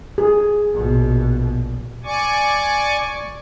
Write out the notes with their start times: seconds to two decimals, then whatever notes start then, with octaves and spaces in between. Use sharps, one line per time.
0.18 G#4
0.72 A#1 B2
2.04 D5 G#5 C#6 D6